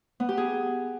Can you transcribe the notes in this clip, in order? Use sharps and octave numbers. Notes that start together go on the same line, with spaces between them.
B3
G4
G#4